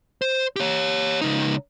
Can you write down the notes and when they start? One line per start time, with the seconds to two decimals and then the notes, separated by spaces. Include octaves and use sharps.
0.22 C5
0.56 G4 C#5
1.21 C#2 D#4